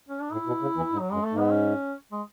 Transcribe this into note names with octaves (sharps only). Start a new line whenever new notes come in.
C#4
D4
A2 E4
B2
C#3
E2 E3
G#2
F#3
F#2 G#3
A3
G#2
B3
C#4
G#3